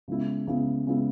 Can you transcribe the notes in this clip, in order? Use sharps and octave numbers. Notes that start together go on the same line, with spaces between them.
C#3 G#3 B3 E4
C#3 G#3 B3 E4
C#3 G#3 B3 E4